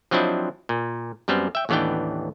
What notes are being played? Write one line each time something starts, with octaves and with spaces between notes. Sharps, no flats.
F3 F#3 C4 D4 E4 D#5
A#2
F#2 G3 B3 C4
E5 G5
A1 D#2 E3 B3 D4 G5